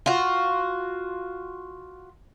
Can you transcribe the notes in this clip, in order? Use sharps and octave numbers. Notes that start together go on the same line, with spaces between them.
F4 F#4